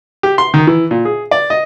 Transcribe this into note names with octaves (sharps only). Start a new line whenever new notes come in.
G4
C6
D#3
E3
A#2
G#4
D5
D#5